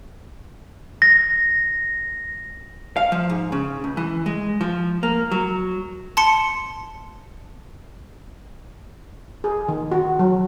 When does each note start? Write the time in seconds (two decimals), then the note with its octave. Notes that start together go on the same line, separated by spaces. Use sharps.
1.02 A#6
2.96 F5
3.12 F3
3.30 G#2
3.52 C#3
3.84 C#2
3.97 E3
4.26 G#3
4.61 F3
5.03 A#3
5.31 F#3
6.17 A5 C6 C#7
9.44 G#4
9.68 D#3
9.92 F#4
10.19 F#3